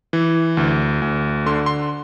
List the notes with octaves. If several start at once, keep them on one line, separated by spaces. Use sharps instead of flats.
E3
D2
D2
D3 C6
C6